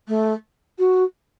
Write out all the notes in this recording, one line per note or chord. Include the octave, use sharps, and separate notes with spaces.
A3
F#4